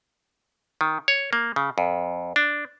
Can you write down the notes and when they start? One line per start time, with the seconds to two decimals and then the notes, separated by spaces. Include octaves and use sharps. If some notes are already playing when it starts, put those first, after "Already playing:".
0.81 D#3
1.08 C#5
1.33 A#3
1.56 C#3
1.78 F2
2.36 D4